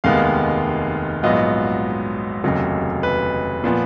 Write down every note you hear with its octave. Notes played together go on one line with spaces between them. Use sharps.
F1 D#2 D#3 G#3 B3 F5
A#1 G#2 F#3 B3 F4 D#5
F1 D#2 C#3 F#3
B4
A#2 F3 B3